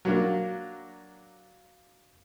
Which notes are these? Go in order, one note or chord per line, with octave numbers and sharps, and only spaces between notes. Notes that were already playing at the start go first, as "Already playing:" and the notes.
F#3 A#3 D4